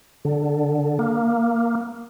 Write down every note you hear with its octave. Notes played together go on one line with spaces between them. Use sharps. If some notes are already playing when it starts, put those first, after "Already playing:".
D3
A#3